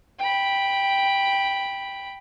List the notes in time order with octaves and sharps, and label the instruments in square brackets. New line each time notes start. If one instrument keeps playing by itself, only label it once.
[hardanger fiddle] G5 B5